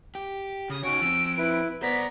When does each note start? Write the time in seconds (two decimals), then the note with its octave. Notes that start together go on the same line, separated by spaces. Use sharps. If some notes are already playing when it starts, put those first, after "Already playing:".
0.15 G4
0.70 C#3 D#6
0.83 C#4 D#4 F#4 C#5 D7
1.01 F3 C4 E6
1.38 E4 B4
1.82 B3 C5 D5 A#5 B6